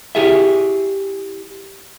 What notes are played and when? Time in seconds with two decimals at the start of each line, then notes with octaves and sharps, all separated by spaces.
0.15 E4 G4 G#4 E5